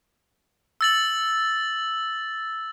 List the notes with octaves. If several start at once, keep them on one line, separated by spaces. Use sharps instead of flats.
E6 A6 F#7